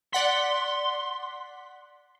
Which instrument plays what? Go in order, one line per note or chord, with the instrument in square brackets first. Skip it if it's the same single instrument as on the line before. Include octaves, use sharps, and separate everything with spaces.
[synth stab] D5 F#5 B6 [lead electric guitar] C6